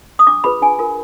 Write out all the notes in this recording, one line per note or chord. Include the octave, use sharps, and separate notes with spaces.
D#6
D4 D6
F4 G#4 B4 B5
D4 G#5
F4 A#4